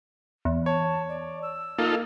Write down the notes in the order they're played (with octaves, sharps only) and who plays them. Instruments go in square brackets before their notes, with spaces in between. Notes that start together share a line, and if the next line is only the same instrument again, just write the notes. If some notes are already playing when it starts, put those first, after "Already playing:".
[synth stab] E2
[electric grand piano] C#5 [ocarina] A5
[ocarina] D5
E6
[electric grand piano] A#3 [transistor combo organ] D#4 F4 A4